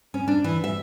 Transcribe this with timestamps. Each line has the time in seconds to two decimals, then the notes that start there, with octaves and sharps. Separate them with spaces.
0.14 C#4
0.28 D4
0.44 E3
0.64 E5